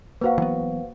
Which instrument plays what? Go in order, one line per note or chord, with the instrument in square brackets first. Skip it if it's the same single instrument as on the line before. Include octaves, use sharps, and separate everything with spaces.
[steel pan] A#3 F#4 [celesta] B4 C5 F5
[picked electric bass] E3 F#3 B3